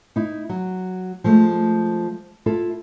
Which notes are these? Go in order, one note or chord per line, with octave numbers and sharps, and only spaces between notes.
D#4 E4
F#3
F3 G#3 A3
E4 F4 A4